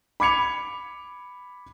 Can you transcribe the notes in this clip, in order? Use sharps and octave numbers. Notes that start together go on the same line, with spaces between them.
B5 D6 G#6 C#7 F7